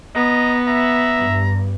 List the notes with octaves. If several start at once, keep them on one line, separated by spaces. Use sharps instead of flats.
B3 D#5 A#5
E5 A#5
G2